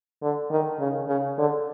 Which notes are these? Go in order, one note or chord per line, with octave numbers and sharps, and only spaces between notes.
D3
D#3
C#3
C#3
D3